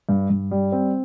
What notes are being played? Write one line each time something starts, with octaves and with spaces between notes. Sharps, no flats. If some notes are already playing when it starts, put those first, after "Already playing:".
G2
G2
G3
C4